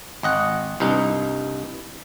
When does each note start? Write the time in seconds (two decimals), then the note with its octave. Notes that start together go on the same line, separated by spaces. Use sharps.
0.23 G#1 D#5 F#5
0.80 C2 G2 D#4